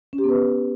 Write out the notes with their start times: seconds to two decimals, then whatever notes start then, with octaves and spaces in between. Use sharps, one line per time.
0.13 C#4
0.18 G4
0.24 B3
0.29 B4